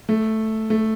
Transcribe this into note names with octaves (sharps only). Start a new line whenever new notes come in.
A3
A3